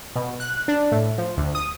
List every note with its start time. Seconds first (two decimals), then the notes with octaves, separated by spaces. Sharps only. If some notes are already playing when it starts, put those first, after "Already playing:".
0.16 B2
0.40 F#6
0.68 D4
0.92 A2
1.18 F3
1.37 D2
1.55 D#6